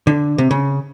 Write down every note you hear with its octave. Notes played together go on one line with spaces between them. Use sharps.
D3
C3
C#3